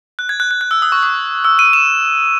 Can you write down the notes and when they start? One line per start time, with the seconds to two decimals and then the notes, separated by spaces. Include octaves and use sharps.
0.19 F#6
0.29 G#6
0.40 F#6
0.51 F#6
0.61 F#6
0.71 E6
0.82 D#6
0.92 C#6
1.03 D#6
1.44 E6
1.59 D#7
1.73 E7